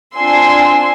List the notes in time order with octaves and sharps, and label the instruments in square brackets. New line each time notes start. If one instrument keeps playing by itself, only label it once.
[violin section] C4 D4 F4 G#5 C6 E6